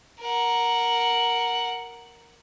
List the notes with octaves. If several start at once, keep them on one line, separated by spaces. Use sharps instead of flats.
A#4 F#5